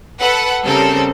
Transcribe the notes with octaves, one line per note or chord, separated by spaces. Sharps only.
A4 B4 F#5
C#3 G3 C4 A4 A#4 C5